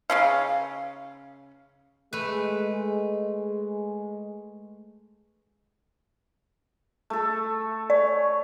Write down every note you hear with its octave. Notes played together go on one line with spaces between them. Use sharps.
C#3 C#4 F5
G#3 A3 B4
A3 A4
C#5 D5